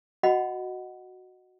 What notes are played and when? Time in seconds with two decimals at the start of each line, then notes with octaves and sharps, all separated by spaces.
0.23 F#4 D#5 F#5 B5